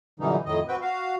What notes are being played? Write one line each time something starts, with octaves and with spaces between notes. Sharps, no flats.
F#2 A#2 D3 E3 G3 D#4
F2 A2 D#3 D#5
C4 F#4 B4 G5
F#4 F5